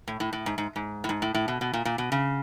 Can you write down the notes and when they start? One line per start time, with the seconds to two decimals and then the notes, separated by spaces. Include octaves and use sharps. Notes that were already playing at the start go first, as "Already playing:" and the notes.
0.08 A2
0.20 A2
0.33 A2
0.46 G#2
0.58 G#2
0.76 G#2
1.04 A2
1.09 G#2
1.22 A2
1.34 A2
1.48 B2
1.61 B2
1.73 A#2
1.85 A#2
1.98 B2
2.12 C#3